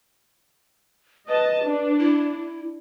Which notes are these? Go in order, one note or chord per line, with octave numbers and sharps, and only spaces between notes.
B4 D#5 A5
D4
E4